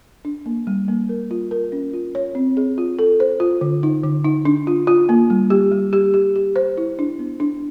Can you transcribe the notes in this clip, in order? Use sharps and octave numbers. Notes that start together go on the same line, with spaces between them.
D4
A#3
G3
A#3
A#4
F4
A#4
C#4
F4
C#5
C4
G#4
F4
A4
C5
F4
D3
D#4
D3
D#4
D4
F4
F4
A#3
G3
G4
G3
G4
G4
G4
C5
E4
D4
B3
D4